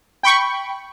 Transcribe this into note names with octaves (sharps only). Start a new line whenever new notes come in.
G5 B5 C#6